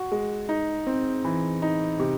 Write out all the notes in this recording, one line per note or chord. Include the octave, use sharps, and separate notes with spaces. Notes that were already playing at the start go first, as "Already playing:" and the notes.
Already playing: F#4
G#3
D#4
C4
E3
D#4
C3